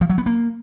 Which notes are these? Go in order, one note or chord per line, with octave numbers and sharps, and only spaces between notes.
F3
F#3
B3
A#3